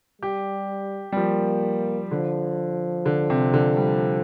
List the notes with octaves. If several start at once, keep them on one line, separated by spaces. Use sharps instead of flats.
G3 G4
G3
F3 A#3
D3 F3
D3
C3
D3
G3